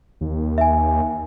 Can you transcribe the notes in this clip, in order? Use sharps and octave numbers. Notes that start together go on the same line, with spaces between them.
D#2
E5 G#5